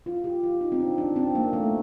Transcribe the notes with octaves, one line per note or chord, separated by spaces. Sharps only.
F4
G4
F4
D#4
C4
D4
D4
C4
A#3
A3